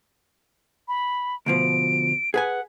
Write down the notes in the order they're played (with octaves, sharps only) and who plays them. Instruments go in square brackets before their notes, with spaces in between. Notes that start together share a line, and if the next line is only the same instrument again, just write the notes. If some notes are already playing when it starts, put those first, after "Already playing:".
[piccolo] B5
[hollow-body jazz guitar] D2 B2 F3 [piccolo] D7
[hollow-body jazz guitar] G#4 B4 G#5 [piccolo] F#5